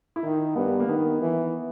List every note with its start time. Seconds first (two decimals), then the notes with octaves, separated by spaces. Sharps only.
0.16 E4
0.24 D#3 D#4
0.55 G2 B3
0.79 A#3
0.88 D#3 B3
1.21 E3